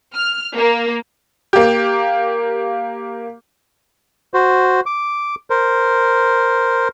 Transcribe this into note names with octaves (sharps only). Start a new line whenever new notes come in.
F6
A#3
A#3 G4
F#4 C5
D6
A#4 C5